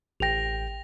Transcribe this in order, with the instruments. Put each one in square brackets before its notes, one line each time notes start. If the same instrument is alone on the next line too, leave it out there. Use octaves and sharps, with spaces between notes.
[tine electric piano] A1 G5 [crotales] A#6 F7